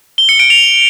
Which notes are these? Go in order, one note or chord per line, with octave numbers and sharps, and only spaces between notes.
G7
C#7
D7
F7